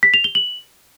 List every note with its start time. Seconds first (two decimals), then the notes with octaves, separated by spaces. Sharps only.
0.03 B6
0.14 F7
0.24 G7
0.35 F#7